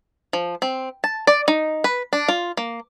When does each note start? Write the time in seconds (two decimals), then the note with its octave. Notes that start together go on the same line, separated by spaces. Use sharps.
0.33 F3
0.62 C4
1.04 A5
1.27 D5
1.48 D#4
1.84 B4
2.13 D4
2.28 F4
2.57 A#3